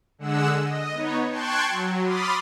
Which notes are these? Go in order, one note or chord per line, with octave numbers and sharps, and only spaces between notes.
D3 G#3 F#5 E6
D#5
B3 D#4 C#5
G5 A5 C6 C#6 F#6 G#6
F#3
B5 C6 D6 D#6 F6 A6